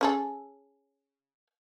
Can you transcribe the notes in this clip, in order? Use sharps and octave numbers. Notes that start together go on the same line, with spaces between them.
C#4 G#4 A4